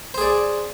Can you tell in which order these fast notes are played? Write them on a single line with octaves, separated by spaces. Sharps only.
C5 G#4 D5